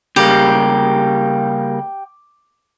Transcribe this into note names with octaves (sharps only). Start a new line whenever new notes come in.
C#3 G3 A#3 G4